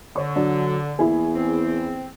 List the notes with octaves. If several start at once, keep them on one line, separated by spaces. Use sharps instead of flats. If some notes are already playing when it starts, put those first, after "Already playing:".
D3 C#5 C#6
F#3 D4
E2 A#3 E4 G#4
C4